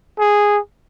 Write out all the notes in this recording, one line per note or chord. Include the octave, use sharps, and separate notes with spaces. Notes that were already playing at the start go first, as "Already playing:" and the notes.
G#4